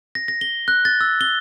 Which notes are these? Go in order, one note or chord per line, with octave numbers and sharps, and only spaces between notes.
A#6
A#6
G7
F#6
A6
E6
G7